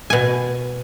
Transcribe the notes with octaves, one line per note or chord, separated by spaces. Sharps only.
B2 G#5